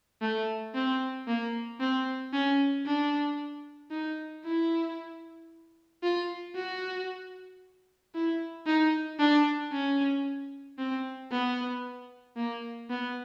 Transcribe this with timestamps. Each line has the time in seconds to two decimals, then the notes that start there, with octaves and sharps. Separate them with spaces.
0.22 A3
0.74 C4
1.27 A#3
1.80 C4
2.33 C#4
2.86 D4
3.91 D#4
4.44 E4
6.03 F4
6.55 F#4
8.14 E4
8.66 D#4
9.19 D4
9.72 C#4
10.78 C4
11.31 B3
12.37 A#3
12.90 B3